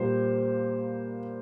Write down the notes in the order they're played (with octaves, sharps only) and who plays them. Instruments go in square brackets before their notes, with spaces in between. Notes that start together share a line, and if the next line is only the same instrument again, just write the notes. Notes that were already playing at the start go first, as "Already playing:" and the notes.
Already playing: [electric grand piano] A#2 G3 A#3 C5